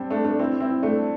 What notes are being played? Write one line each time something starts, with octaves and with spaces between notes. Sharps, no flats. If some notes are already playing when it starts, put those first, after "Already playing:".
Already playing: G3 C4 D4
A3 D4
A3 D4
C4 E4
C4 E4
A3 D4